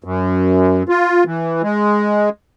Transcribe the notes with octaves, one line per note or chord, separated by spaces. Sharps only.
F#2
F4
E3
G#3